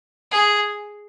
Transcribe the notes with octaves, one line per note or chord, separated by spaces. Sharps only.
G#4